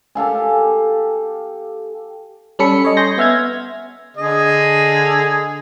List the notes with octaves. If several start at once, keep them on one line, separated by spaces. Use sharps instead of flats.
G4 A4 F5 G#5
G3 C#4 A4 B5 C#7
C#5 D#5
G#5 C6 G6 A#6
B3 E5 F6 G#6
D3 G#4 D#5